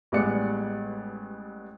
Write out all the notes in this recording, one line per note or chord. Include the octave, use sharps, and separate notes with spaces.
A1 G3 G#3 B3 D5 C#7